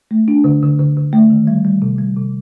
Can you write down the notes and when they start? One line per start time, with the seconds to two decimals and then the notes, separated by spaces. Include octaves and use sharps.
0.11 A3
0.28 D4
0.44 D3
0.62 D3
0.80 D3
0.97 D3
1.13 A3
1.30 D#3
1.47 G3
1.65 G3
1.82 C3
1.99 G3
2.17 C3